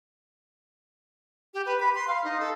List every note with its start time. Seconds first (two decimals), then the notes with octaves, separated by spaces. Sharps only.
1.54 G4
1.66 B4
1.80 B5
1.95 C6
2.08 F5
2.24 D#4
2.40 A4